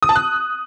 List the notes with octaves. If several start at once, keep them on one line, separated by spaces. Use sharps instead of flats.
D#6
A5
F#6